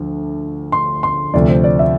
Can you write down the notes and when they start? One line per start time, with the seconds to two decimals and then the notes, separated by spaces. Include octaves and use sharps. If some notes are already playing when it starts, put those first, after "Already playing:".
Already playing: D2 D3 F3
0.72 C6
1.03 C6
1.34 D2 C3 F3 D5
1.49 C5
1.64 D5
1.79 E5